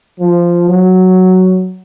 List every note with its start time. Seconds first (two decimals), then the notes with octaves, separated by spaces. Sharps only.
0.19 F3
0.69 F#3